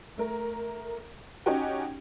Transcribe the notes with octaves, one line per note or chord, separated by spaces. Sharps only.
A3 A#4
C#4 D#4 F#4 G4 G5